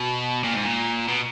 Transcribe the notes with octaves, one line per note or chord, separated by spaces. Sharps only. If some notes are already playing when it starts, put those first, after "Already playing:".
Already playing: B2
A#2
G#2
A#2
B2